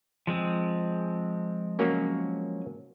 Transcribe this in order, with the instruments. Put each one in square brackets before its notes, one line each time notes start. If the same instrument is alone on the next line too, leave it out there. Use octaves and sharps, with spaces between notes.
[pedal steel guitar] F3 G#3 C4
[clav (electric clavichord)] F#3 A#3 C#4